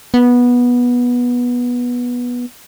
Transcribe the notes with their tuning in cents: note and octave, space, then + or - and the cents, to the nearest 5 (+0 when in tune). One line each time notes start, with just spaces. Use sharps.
B3 -15